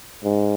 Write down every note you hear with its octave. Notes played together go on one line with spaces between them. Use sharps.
G#2